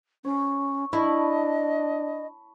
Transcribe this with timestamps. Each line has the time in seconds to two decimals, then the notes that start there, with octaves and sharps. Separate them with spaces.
0.25 C#4 C#5
0.93 D4 E4 D#5 A5 B5 C#6